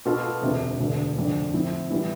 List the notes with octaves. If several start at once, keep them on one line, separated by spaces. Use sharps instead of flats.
B2 B3 F4 A4
E1 D2 C3
E1 D2 D3
F1 F2 D3
A2 F3 C4 E4
A2 E3 G3 B3 E4